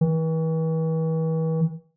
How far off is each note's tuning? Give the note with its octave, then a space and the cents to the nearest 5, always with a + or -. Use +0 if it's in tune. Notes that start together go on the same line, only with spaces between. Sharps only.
E3 -40